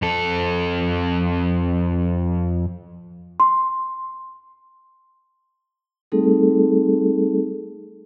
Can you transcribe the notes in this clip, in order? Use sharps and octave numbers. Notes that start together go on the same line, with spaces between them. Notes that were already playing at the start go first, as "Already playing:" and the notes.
F2 A4
C6
G3 A3 C4 D#4 G#4 A4